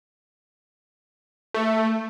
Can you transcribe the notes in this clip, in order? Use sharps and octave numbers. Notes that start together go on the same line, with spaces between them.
A3